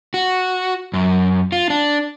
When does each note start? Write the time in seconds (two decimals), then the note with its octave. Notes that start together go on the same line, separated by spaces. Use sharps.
0.14 F#4
0.94 F#2
1.52 F4
1.70 D4